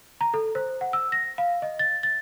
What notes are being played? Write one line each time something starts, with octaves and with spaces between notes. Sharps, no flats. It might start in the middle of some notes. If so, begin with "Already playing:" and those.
A#5
A4
C5
F#5
E6
A#6
F5
D#5
A6
A6